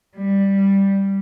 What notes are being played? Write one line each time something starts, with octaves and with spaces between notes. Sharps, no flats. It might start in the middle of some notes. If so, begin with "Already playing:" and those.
G3